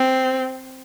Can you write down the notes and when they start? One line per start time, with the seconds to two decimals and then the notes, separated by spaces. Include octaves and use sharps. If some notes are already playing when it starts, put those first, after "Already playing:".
Already playing: C4